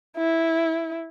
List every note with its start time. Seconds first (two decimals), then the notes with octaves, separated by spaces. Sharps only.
0.17 E4